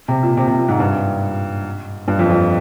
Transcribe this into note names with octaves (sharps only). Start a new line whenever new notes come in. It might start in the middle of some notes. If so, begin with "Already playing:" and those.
C3
A#2
C3
C3
A#2
G#2
G2
G2
F2
F2